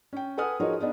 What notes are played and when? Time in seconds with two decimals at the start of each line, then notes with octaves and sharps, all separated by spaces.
0.13 C#4 G5
0.38 A4 B4 F#5 G#5 D#6 F6
0.60 F3 D#4 F#4 G#4 A#4 C#5
0.79 B3 D4 D#4 G#4